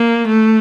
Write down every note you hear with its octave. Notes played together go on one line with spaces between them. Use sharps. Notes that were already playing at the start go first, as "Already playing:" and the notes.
Already playing: A#3
A3